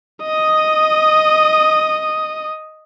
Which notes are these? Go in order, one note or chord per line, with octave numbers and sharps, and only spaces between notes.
D#5 D#6